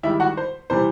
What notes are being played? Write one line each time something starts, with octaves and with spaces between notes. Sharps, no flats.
G#2 D#3 G3 E4 E5
F#4 F#5
C5
C3 E3 G3 C5